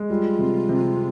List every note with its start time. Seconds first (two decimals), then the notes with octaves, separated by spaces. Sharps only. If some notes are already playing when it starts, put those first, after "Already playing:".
Already playing: G#3
0.09 G3 F4
0.39 C3
0.69 C3